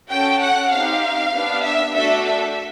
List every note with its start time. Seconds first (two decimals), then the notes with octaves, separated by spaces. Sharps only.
0.10 C#4 F#4 A4 G5
0.42 F#5
0.71 C4 D#4 G4 F5
1.33 B3 D4 G4
1.63 E5
1.94 A3 D4 F#4 A4 E5
2.24 E5